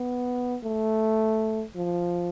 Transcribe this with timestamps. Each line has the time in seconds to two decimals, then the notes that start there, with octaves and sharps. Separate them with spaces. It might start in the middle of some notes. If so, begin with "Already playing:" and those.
Already playing: B3
0.64 A3
1.76 F3